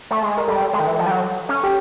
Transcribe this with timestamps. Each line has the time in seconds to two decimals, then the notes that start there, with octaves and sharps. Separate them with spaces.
0.11 A3
0.23 G#3
0.38 A#4
0.48 G3 A4
0.73 G#3
0.80 D#3
0.86 E3
0.99 F3
1.06 G3
1.11 F#3
1.49 C#4
1.64 G4